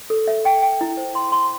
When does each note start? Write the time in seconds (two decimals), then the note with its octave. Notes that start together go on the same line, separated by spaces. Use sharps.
0.10 A4
0.27 E5
0.45 G5
0.62 G5
0.81 E4
0.97 C5
1.15 C6
1.32 C6